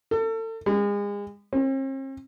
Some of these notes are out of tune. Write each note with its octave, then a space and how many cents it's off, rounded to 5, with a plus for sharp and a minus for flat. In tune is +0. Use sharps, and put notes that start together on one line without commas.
A4 +35
G#3 -35
C4 +45